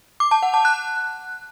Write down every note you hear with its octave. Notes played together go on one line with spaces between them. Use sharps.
D6
A5
F#5
A5
F#6